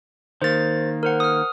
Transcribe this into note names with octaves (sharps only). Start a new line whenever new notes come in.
D#3 A#3 C5 A6
A#4 C5 F#5
D#6 F6